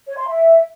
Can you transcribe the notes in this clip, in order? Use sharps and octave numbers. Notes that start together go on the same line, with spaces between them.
C#5
C6
E5